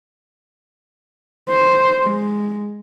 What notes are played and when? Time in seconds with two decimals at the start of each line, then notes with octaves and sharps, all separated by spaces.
1.49 C5
2.03 G#3